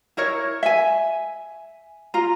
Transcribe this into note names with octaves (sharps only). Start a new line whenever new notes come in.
E4 A#4 C#5
E5 G#5
F4 A#5